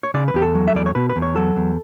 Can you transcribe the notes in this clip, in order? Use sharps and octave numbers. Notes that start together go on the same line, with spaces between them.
C#5
C#3 D5
B4
E2 G4
A4
F#3
E5
E2 D5
C#5
B2 B4
B4
E2
C#5
F#3 A4
E2